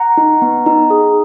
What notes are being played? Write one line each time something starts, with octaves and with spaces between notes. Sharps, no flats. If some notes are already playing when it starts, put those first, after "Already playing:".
Already playing: F#5 A#5
D#4
B3
D#4
G#4